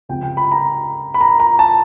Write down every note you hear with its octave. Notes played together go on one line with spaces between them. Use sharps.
C#2 C3 F3 G5
G5
B5
A#5
B5
A#5
A#5
A5